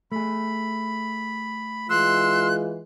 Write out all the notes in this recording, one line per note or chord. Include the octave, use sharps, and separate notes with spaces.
A3 G#4 B5
E3 G#3 F4 C6 E6 F#6